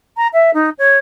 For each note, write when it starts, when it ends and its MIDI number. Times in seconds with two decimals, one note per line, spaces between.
0.17 0.27 82
0.33 0.51 76
0.54 0.70 63
0.78 0.98 73